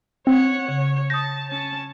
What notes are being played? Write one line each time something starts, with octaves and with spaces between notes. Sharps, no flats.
C4 C#5 F#5
C#3 C#5
A5 D#6 G6 A#6
C#4 A5